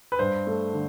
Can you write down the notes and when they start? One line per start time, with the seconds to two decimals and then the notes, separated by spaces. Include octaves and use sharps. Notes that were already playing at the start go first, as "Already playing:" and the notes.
0.12 B4
0.19 G2 C5
0.47 A3
0.73 D3